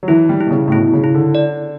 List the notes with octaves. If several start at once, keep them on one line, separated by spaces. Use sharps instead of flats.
F#3
E3 E4
G3
E4
B2
C#3
A2
B2 E4
C#3
E4
D3
D5